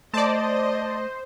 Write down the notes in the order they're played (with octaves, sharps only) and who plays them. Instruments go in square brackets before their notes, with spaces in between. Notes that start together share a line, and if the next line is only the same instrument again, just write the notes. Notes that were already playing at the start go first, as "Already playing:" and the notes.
[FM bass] A3 [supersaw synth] C5 [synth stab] D5 A5 [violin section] D#5